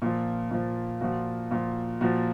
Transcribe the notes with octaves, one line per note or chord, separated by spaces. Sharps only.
A#2 F3
A#2 F3
A#2 F3 F#4
A#2 F3
A#2 F3 F#4